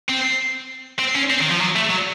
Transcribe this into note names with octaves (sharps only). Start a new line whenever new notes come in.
C4
C4
C#4
C4
D#3
F3
F#3
A3
F#3